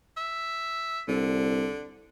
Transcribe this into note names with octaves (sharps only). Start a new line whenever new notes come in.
E5
C2 D3